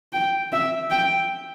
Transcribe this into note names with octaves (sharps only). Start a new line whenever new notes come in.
G5
E5
G5